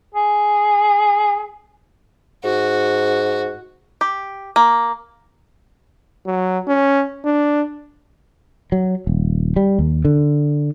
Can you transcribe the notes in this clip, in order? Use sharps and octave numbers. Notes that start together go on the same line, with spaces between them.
G#4
G#2 F#4
G4
A#3
F#3
C#4
D4
F#3
D#1
G3
D#2
D3